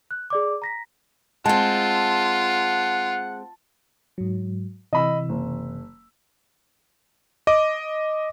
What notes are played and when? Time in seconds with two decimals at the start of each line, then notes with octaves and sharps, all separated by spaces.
0.11 F#6
0.30 G#4 D5 D6
0.62 A#5 A#6 B6
1.46 G#3 C4 F4 F#5 A5
4.18 G#2 F#3
4.93 C3 E3 D#5 B5 E6
5.29 F#1
7.47 D#5 D6